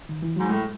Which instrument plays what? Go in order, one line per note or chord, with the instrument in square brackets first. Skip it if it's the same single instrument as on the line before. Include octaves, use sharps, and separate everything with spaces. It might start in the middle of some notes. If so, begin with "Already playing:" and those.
[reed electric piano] D#3
E3
[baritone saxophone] G#2 [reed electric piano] F#3
[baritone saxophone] A2 [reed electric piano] G#3